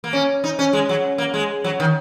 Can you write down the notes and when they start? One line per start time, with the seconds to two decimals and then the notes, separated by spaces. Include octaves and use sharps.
0.04 A#3
0.13 C#4
0.44 D#4
0.59 C#4
0.73 G#3
0.89 F#3
1.18 A#3
1.34 G#3
1.64 F#3
1.80 D#3